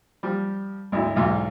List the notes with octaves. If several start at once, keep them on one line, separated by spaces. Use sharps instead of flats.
F3 G3
G#1 D2 E4
B1 E2 G#2 F4